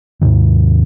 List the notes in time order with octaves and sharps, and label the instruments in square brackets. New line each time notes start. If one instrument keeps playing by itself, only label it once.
[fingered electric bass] D#2 G#2 C3 D#3